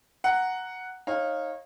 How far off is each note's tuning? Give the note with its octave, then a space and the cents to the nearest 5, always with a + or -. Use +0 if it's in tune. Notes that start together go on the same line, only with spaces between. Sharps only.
F#5 +0 A#5 +0
D#4 +0 C#5 -30 F5 +0